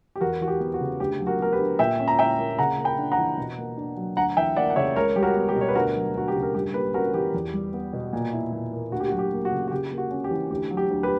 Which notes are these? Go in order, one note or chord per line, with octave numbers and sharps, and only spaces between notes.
G4
E2 F#4 A#4
E3 F#4
G4
B3
F#4
C#3
D2 G4
F#3
F#4 A#4
B3 A#4
G4 B4
D3
A#2 E5 G5
C#4
A#5
E4 E5 G5
A#3
C#3 F#5 A#5
A#3
G5 B5
D4
F#5 A#5
E3
B2
A#3
D4
F#3
D2 F#5 A#5
E3 E5 G5
A#3 D5 F#5
F#5
C#3 C#5 E5
C#2 A#4 C#5
G3 G4
F#4 A#4
B3
G4
B2
C#5
B4
D2 F#4 A#4
F#3
D2 F#4
G4
C#3
A#4
G2 G4
A#3 G4 B4
C#4 F#4 A#4
E3 G4
E2
G3
B3
B2
A#2
E4
A#2
A#3
D2 F#4
G4
F#4
F#3
G4
A#3
F#4
C#3
F#4
C#3 G4
A#3
F#4
C#4
G4
E3
D2 G4
F#3
G4
D2
G4 B4